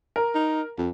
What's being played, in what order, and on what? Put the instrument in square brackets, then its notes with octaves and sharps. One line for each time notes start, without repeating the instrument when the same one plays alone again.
[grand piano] A#4
[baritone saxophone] D#4
F2